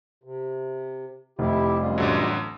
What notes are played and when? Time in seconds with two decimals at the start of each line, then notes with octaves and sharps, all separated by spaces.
0.24 C3
1.39 F1 E4 G4
1.79 F#2 G3 F4
1.98 A1 D3 F#3